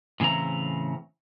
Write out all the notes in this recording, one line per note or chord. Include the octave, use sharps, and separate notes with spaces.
A2 C#3 E3 C4 A#5